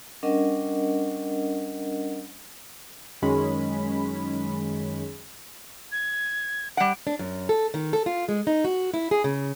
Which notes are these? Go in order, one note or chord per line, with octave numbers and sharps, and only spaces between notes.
G3 C#4 D4 A#4 D#5 F#5
F#2 D#3 G#3 C#4 B5
G#6
G3 F#5 D7
D4
F#2
A4
D#3
A4
F4
G#3
D#4
F#4
E4
G#4
C#3